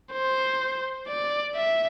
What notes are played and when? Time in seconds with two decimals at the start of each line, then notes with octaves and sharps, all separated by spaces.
0.13 C5
1.08 D5
1.55 E5